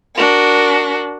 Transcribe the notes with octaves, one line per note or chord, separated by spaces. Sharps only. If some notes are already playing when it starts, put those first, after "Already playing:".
D4 F#4 A#4